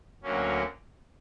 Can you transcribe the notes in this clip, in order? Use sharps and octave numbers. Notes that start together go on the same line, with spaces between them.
D2 D3 F#3 A#3 C#4